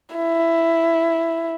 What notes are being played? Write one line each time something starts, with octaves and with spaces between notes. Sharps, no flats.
E4